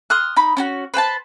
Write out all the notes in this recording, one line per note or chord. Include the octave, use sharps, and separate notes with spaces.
C6 D#6 F6 F#6
D#4 B5
C#4 D4 F#4
B4 C5 G5 A5